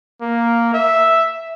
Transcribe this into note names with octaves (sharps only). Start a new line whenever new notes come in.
A#3
E5